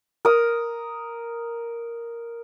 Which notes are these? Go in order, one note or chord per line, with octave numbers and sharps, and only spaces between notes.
A#4 D#6